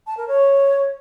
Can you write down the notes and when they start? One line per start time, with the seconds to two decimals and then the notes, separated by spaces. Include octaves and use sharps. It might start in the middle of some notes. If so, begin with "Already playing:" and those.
0.07 A5
0.17 A#4
0.28 C#5